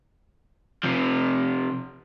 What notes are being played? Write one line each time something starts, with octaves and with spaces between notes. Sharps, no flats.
C3 F3